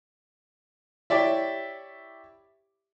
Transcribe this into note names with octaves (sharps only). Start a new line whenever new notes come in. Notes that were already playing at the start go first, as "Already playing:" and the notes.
E4 G4 C#5 D5 E5